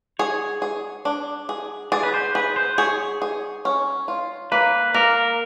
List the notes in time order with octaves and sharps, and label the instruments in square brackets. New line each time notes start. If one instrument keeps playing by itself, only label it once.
[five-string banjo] G#4 [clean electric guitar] C#5
[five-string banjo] G#4
D4
G#4
[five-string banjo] G#4 [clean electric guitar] D5
[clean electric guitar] B4
C5
[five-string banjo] G#4 [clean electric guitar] B4
[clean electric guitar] C5
[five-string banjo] G#4 [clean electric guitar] C#5
[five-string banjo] G#4
C#4
F4
[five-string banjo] A#3 [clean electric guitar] B4
[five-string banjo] A#3 [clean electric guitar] A#4